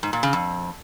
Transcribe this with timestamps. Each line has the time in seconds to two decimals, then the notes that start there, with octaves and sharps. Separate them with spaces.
0.03 G#2
0.13 A#2
0.23 C#3
0.33 F2